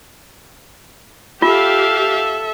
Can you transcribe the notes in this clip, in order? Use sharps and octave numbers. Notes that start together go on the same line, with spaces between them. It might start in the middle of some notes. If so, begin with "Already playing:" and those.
F4 G4 A4 E5 F5